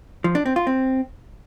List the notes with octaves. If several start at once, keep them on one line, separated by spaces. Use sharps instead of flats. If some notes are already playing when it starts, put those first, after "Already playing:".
F3
D4
C4
F4
C4